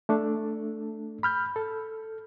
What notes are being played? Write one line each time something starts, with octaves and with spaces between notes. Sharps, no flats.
A3 D4 A4
B5 F6 G6
A4